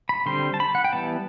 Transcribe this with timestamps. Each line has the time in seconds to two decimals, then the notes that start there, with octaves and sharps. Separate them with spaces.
0.09 B5
0.26 D3 G3 C4 C6
0.54 A5
0.60 B5
0.75 F#5
0.84 G5
0.93 E3 G3 B3 A5